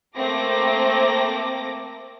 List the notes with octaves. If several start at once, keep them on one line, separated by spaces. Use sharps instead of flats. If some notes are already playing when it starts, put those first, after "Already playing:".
A3 A#3 C4 D6 A#6